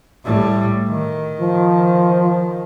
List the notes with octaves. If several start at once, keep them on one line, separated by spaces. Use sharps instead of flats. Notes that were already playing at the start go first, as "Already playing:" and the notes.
A2 G3
D#3
F3